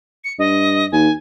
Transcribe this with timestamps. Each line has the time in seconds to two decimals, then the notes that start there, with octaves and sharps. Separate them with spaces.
0.24 C#7
0.39 G2 D#5
0.92 D#2 G#5